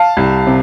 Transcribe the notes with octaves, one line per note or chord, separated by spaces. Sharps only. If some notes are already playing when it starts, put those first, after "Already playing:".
Already playing: F5 A5
C2
C3